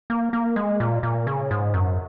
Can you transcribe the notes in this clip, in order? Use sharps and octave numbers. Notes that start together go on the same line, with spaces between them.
A#3
A#3
G#3
A#2
A#2
C#3
G#2
F#2